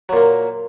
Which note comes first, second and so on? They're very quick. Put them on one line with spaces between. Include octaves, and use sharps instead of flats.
F#3 A#2 A#3